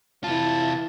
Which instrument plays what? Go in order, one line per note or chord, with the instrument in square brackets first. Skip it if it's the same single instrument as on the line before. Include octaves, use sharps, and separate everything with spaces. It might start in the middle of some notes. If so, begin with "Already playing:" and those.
[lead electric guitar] C3 F4 [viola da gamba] E3 E4 [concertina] A5